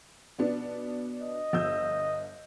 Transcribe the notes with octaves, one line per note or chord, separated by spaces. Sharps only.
B2 B3 D4
D#5
G1 E6 G6